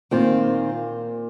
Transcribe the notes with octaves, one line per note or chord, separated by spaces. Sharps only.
A#2 D#3 C4 F4